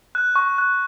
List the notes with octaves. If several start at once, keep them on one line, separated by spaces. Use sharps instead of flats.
F#6
C#6
F#6